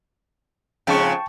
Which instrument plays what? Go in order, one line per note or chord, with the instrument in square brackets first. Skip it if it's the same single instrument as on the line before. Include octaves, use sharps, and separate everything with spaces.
[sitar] F2 G#2 C#3 [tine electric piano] G5 A5 C#6